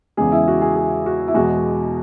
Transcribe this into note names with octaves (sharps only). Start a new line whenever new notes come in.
E2 C#3 G#3 G#4
E4
F#4
G#4
G#4
F#4
E4
E2 B2 G#3 F#4